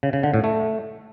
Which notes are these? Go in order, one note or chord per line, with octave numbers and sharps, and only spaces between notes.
C#3
C#3
D3
A2
A3